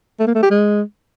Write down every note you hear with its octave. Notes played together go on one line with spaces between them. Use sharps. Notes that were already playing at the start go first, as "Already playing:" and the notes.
A3
A#3
A3
G4
G#3